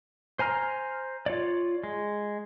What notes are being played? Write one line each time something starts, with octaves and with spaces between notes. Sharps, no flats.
C5 G#5 A#5 F6
F4 C#5 D5
G#3